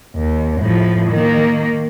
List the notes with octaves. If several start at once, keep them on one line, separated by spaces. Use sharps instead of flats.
D#2
A2 F3
D#3 A#3